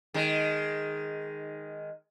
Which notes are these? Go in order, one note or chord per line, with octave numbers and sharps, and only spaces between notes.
D#3 G#3